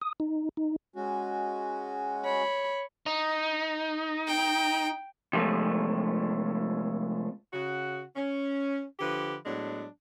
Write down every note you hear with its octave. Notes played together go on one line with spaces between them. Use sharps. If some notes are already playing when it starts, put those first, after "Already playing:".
D#6
D#4
D#4
G#3 C#4 F#4
C#5 B5
D#4
G5
C3 F3 G#3 A3
C#3 F#4
C#4
D3 F3 G4 B4
A2 F#3 G#3 B3 D4